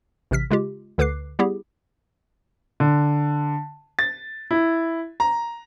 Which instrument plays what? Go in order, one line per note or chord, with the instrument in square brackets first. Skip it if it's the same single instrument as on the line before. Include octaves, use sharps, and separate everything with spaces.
[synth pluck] A1 C3 F6 B6
C#3 G#3 F4 G4
D2 D3 B4 D6 F#6 C7
G3 B3 E4 G4 G#4
[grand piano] D3
A6
E4
A#5